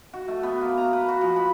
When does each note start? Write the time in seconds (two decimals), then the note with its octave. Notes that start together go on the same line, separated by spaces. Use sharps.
0.13 F#4
0.28 A3
0.43 B3
0.61 A#3
0.78 A#5
0.93 B4
1.08 F#4
1.21 F3
1.36 B5